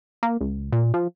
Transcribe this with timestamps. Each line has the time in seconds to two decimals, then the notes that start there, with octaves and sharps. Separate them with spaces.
0.23 A#3
0.41 C#2
0.72 A#2
0.94 F3